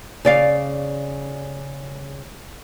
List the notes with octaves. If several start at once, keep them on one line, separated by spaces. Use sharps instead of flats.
C#3 D5 F5